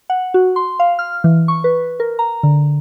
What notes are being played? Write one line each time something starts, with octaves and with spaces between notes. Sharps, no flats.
F#5
F#4
C6
F5
F6
E3
C#6
B4
A#4
A#5
D3